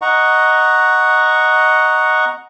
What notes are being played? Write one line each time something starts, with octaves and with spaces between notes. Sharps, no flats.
D#5 F#5 A#5 C#6